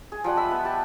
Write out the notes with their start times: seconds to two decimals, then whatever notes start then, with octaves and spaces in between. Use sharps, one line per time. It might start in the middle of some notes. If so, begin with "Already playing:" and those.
0.12 G#4
0.24 F3 G3 F#5
0.36 D#5 E5 B5
0.51 B3
0.65 G4 A5